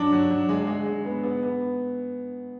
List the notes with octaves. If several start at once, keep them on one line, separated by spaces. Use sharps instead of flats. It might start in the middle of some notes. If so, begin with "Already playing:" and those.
Already playing: F#3 D4
F#3
F#3
G#3
G#3
G#3
B3
B3
B3